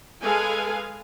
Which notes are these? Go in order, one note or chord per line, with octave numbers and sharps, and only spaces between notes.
G#3 G#4 A4 B4 F5 G#5